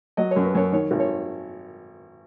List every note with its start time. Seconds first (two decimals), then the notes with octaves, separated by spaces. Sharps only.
0.17 F#3 D#5
0.31 C#5
0.36 F#2
0.45 B4
0.55 F#2 C#5
0.72 D#3 C#5
0.91 G#1
1.00 C#5